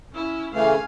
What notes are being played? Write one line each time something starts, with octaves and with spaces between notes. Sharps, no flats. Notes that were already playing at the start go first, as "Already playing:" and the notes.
C#4 E4
C#3 E3 A3 F5 G#5